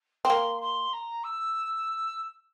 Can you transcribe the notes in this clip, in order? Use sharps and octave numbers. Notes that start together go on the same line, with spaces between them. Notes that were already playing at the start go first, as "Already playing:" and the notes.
C4
A#3 C6
C6
A#5
E6